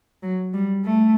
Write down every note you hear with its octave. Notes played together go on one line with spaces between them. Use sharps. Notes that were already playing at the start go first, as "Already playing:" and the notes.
F#3
G3
A3